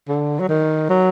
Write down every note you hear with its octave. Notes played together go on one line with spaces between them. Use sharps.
D3
F#3
D#3
F#3